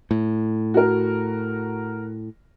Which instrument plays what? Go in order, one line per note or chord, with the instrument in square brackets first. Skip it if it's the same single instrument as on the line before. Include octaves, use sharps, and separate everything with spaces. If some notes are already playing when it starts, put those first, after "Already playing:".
[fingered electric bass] A2
[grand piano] F#4 A#4